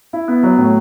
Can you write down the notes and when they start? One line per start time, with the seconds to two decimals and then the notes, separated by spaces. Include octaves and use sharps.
0.13 E4
0.28 B3
0.43 F#3
0.58 A2